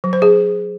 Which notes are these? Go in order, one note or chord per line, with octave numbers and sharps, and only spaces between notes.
F#3
C5
G#4